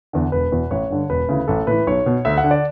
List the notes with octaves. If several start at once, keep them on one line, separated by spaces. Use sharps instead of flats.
E2 D3
E1 B4
E2 B2
A1 C#5
G2 D3
E1 B4
D2 C#3 E3
A1 A4
A2 E3 B4
B1 C#5
B2
D2 E5
F#5
D3
D5